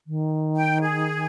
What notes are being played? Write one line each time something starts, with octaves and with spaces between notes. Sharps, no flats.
D#3
G5
G#4